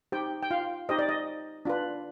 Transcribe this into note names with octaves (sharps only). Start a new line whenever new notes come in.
D#4 G4 C5 G5
G5
F4 F5
D#4 G4 C5 D#5
D5
D#5
D4 F4 B4